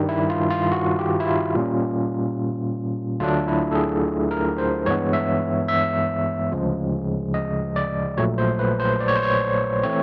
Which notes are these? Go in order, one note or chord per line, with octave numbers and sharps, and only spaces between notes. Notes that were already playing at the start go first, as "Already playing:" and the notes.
Already playing: G2 D#3 G3
E4
F4
F4
F#4
G4
E4
F4
A#2 G3 A#3 C#4
D2 D3 F#3 A3 D4 F4
E4
A4
G#4
A#4
C5
G2 E3 G#3 B3 C#5
E5
E5
D2 C#3 F3 G#3
D#5
D5
A#1 A#2 F#3 A3 C#5
C5
B4
C5
D5
C#5
C5
C#5
E3 A3 C4 C#5